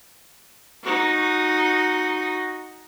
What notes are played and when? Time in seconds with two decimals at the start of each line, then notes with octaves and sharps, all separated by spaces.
0.83 D#4 F#4